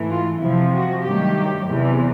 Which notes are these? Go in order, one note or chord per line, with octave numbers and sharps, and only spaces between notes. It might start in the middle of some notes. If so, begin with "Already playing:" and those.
Already playing: G#2 E3 A3
F4
F2 C3 F3 E4
F#4
G2 D#3 F#3 A3 G4
E2 C3 E3